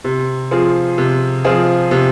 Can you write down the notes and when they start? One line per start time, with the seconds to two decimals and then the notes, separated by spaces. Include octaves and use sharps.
0.04 C3
0.51 F3 C4 F4 G#4
0.98 C3
1.45 F3 C4 F4 G#4
1.91 C3